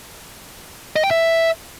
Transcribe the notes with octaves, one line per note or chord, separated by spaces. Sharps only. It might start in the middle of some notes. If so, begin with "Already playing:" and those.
D#5
G5
E5